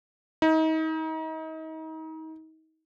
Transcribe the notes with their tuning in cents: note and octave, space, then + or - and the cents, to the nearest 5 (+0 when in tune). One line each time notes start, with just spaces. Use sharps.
D#4 +35